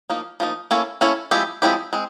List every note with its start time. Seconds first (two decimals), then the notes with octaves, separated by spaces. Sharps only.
0.10 F3 A#3 D#4
0.40 F3 A#3 D#4
0.71 A#3 C#4 E4 A4 C#5
1.01 A#3 C#4 E4 A4 C#5
1.31 F3 G#3 C4 E4 G4
1.62 F3 G#3 C4 E4 G4
1.93 G#3 C4